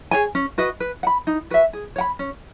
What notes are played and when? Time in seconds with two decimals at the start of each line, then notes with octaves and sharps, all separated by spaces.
0.11 G#4 C#5 G#5
0.35 C#4
0.58 F#4 B4 D#5
0.80 B4
1.03 F#5
1.07 B5
1.27 D#4
1.50 F#4 B4 E5
1.73 G#4
1.96 C#5 F#5 B5
2.19 C#4